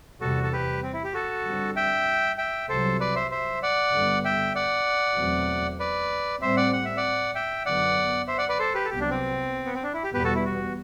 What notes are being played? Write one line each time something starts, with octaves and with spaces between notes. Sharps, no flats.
E2 C3 G3 F#4 A4
A4
G4 B4
C4
E4
G4
F#4 A4
G2 D3 G3 C4
E5 G5
E5 G5
C2 C3 F#3 A4 C5
B4 D5
C5 E5
C5 E5
D5 F#5
G2 D3 G3 B3
E5 G5
D5 F#5
E2 B2 F#3 A3 C4
B4 D5
A2 G3 C4 C5 E5
D5 F#5
F#5
E5
D5 F#5
E5 G5
F#2 D3 F#3 B3 D5 F#5
C5 E5
D5 F#5
B4 D5
A4 C5
G4 B4
A4
C2 C3 F#3 B3 G4
D4
C4
B3
C4
D4
E4
G4
E2 B2 G3 B3 G4 B4
F#4 A4
E4
F#4